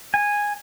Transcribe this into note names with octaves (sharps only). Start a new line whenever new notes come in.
G#5